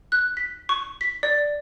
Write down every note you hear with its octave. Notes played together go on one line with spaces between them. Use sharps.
F#6
B6
C#6
B6
D5